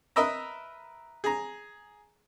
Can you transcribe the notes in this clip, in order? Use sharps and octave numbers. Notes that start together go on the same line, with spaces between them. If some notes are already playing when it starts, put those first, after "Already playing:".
A#4 B4 D#5 E5 A#5
G#4 A#5